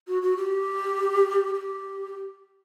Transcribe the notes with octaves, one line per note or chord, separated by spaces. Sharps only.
F#4
F#4
G4
G4